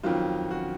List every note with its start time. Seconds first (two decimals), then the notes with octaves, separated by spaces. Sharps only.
0.03 F2 D#3 F#3 F4
0.51 F#4